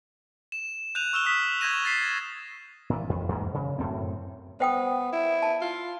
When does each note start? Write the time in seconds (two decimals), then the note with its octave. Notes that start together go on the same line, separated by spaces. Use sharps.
0.52 E7
0.95 F#6 G6 D#7 F7
1.13 C#6 E6 F6 E7 G7
1.25 D#6 B6
1.61 C#6 G6 G#6 A#6 D#7
1.85 A6 B6 C7
2.90 A#2 E3
3.10 F2
3.29 E2 G#2 A#3
3.54 C#3
3.78 F#2 A2 C4
4.60 B3 C5 G5 D#6
5.13 E4
5.43 A5
5.61 F4